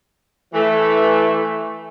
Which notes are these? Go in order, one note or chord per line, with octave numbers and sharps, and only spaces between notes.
E3 A3